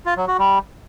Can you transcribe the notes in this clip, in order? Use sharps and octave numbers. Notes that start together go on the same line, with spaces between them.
F4
F#3
F#4
G3